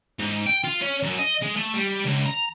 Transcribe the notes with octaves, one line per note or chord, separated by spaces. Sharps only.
G#2
G5
F4
C#4
F#2
D#5
G#3
A3
G3
C#2
A#5